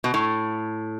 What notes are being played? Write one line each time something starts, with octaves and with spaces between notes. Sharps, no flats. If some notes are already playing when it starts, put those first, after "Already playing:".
B2
A2